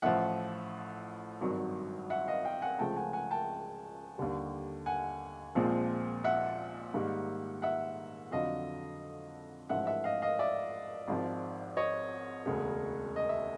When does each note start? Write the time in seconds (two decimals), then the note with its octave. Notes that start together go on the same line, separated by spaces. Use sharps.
0.02 A1 A2 F3 E5 F#5
1.41 G#1 G2 D#3 F#3
2.10 E5 F#5
2.27 D#5 F5
2.45 F5 G5
2.62 F#5 G#5
2.79 C#2 C#3 F3 A3 G5 A5
2.96 F#5 G#5
3.13 F#5 G#5
3.31 G5 A5
4.18 D#2 D3 G3
4.86 F#5 G#5
5.55 A#1 A#2 F3 G#3 C4
6.24 E5 F#5
6.94 G#2 D#3 G3 A#3
7.62 E5 F#5
8.31 F2 D3 F#3 D#5 F5
9.69 A1 G#2 F3 E5 F#5
9.87 E5 F#5
10.04 D#5 F5
10.22 D#5 F5
10.39 D5 E5
11.08 G#1 G#2 F3
11.77 C#5 D#5
12.46 E1 D2 C#3
13.16 D#5
13.29 E5